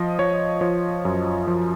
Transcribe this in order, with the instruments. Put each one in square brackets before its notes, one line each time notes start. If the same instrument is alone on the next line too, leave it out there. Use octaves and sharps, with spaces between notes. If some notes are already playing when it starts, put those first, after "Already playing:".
Already playing: [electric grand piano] F3 D#5
F3 C#5
F3 C#5
F#2
F3